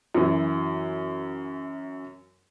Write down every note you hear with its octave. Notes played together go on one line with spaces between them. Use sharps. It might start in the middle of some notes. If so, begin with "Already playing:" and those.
F#2 E3